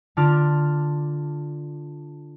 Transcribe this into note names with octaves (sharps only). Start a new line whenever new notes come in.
D3 D4 F4 F6 D7